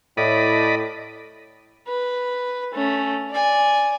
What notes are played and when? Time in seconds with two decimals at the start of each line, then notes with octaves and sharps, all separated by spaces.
0.17 A2 D5 D#5 B5
1.88 B4
2.74 A3 C#4
3.30 D5 G#5